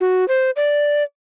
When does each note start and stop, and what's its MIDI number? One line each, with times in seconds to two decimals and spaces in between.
0.01 0.27 66
0.28 0.51 72
0.56 1.03 74